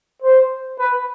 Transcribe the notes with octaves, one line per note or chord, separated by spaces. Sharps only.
C5
B4